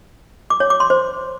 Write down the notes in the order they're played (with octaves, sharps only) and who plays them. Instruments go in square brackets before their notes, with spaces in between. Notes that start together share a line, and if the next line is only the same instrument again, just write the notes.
[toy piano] D6
C#5
D6
C6
C5